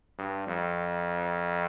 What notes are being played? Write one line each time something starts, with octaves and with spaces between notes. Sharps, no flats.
G2
F2